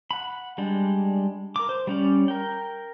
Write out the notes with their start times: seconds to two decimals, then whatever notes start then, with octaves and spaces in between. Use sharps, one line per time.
0.11 F#5 B5
0.58 G3 G#3 D4
1.56 A#4 D6
1.69 C5
1.87 G3 C#4 D5
2.28 A#4 G5